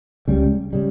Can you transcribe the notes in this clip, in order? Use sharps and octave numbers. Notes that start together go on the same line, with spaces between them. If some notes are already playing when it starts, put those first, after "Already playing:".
C#2 C#3 G3
C#3 G3